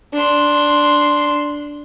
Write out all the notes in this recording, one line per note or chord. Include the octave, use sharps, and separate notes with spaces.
D4 C6